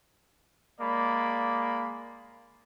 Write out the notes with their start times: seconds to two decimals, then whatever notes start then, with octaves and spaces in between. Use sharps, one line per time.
0.81 G#3 A#3 D5 B5